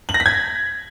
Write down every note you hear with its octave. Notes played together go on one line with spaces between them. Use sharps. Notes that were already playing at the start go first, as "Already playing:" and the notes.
F#7
A#6
B6
G#6